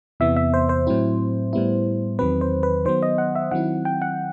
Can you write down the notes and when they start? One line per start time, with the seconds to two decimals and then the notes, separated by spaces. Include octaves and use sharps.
0.20 E2 C3 E3 B3 E5
0.37 E5
0.54 C5
0.69 C5
0.87 A2 F#3 C4 E4
1.53 A2 G3 B3 E4
2.19 E2 D#3 F#3 C4 B4
2.41 C5
2.63 B4
2.85 D#3 F#3 B3 C5
3.03 D#5
3.18 F#5
3.35 E5
3.51 D#3 F#3 C4 E4 F#5
3.85 G5
4.02 F#5